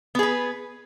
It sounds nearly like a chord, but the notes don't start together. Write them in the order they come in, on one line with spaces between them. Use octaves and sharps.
B3 G#4 B4